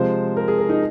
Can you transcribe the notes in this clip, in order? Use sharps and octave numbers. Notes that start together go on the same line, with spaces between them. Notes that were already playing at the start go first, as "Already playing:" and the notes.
Already playing: C3 F3 G#3 C5
A#4
G#4
A#4
D#4